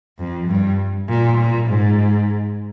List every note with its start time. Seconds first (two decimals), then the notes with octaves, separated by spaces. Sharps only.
0.19 F2
0.48 G2
1.08 A#2
1.38 A#2
1.68 G#2